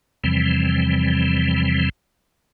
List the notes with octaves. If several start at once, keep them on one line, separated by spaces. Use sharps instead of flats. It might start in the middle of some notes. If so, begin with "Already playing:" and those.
E2 C3 E3 F3 G3 C4